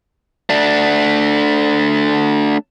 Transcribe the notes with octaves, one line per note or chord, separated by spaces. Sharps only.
A3 D4